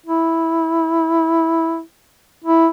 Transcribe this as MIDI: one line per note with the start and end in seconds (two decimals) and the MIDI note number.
0.06 1.81 64
2.44 2.68 64